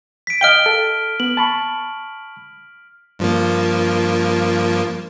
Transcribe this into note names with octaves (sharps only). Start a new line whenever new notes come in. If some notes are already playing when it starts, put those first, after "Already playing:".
B6 D7
D#5 F5 G5 F6 D7 G7
A4
B3 F#7
A5 B5 C#6
G2 F3 A#3